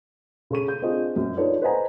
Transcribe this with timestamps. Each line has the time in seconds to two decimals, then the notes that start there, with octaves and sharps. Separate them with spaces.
0.50 C#3 A4 C#6 D#7
0.68 G6
0.82 C4 D4 F4 G#4 D#5
1.16 F#2
1.37 D#4 F4 A4 B4 C#5 D5
1.62 B4 C5 D#5 F#5 G#5 A#5